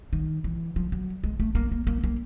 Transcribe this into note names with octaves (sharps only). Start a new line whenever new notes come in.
D#3
E3
F3
F#3
G#3
A3
A#3
A#3
A#3
A#3